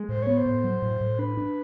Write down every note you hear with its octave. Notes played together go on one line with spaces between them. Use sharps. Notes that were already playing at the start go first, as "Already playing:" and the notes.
Already playing: G#3
A2 C5
B3 C#5
C5
A2
F#3
A2
A2
D4 B4
D4